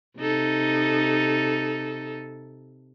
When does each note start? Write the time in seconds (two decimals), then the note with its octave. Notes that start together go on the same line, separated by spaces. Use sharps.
0.19 C3 D#4 A4